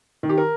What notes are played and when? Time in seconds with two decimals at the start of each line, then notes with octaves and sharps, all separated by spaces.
0.23 D#3
0.29 G4
0.38 A#4